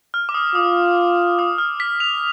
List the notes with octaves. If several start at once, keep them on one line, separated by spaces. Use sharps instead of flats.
F6
D6
D#6
F4 D#6
D#6
F6
B6
F7